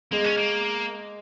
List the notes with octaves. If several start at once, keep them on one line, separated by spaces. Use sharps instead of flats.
G#3 A#3
C#4
A#3